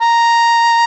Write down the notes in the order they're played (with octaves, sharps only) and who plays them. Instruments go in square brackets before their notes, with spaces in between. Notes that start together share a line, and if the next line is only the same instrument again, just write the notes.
[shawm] A#5